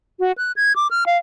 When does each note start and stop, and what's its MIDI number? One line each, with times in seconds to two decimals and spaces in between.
0.20 0.32 66
0.38 0.52 90
0.56 0.75 92
0.76 0.88 86
0.91 1.04 89
1.06 1.17 77